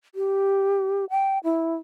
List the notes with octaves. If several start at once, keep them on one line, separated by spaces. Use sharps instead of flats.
G4
G5
E4